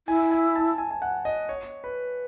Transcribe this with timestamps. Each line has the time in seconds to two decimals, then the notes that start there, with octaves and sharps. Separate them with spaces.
0.08 E4 G#5
0.31 G#5
0.56 A5
0.78 G#5
0.91 G#5
1.02 F#5
1.25 D#5
1.49 C#5
1.84 B4